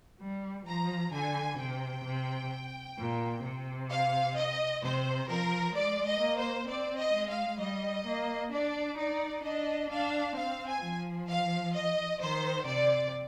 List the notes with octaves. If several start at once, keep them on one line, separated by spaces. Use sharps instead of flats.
G3
F3 A#5
D3 G#5
C3 G5
C3
A#2
C3
F5
D#5
C3 C5
F3 A#4
G#3 D5
D#5
A#3
C5
C4 D5
D#5
G#3
F5
G3 D#5
A#3
D4 D5
D#4 D5
D4 D#5
D4 F5
C4 F5
G#5
F3
F5
D#5
D#3 C5
C3 D5